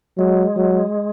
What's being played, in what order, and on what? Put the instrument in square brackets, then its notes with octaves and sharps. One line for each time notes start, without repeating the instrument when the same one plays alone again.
[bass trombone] F#3 [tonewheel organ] G#3
[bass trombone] F#3